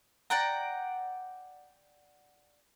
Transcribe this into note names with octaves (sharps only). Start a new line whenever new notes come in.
D5 F#5 G5 A#5